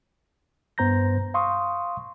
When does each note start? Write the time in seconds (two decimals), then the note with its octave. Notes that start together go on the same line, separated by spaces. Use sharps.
0.78 G2 B3 C5 A#5 G6 A#6
1.34 F5 C6 C#6 D#6